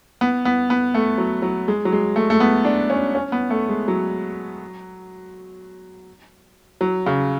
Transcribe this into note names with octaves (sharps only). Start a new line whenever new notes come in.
B3
B3
B3
A3
F#3
F#3
G#3
F#3
G#3
A3
A3
B3
D4
C#4
C#4
B3
A3
G#3
F#3
F#3
C#3